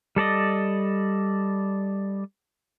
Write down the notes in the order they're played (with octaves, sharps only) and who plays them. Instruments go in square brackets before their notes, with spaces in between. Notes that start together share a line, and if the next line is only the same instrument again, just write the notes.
[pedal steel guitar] G3 A4 D5 D#5